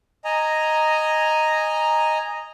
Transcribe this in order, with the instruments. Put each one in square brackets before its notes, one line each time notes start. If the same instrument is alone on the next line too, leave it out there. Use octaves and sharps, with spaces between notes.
[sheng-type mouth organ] D#5 G#5 A#5